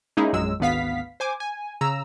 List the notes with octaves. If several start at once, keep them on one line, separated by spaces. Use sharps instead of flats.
G#3 A#3 C#4 D#4 E4 G#4
A#1 F#2 F#3 G#3 E6
G#1 D2 B3 F5 B6
C5 G#5 D6
G#5
C#3 A#5 E6